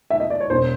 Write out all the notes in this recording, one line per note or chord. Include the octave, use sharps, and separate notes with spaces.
E5
D#5
D5
C#5
E1 C5